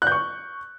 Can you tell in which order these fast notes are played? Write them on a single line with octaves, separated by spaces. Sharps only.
F#6 G6 C#6